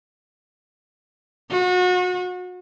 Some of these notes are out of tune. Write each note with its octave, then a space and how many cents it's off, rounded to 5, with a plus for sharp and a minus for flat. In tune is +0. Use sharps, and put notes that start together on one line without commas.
F#4 -35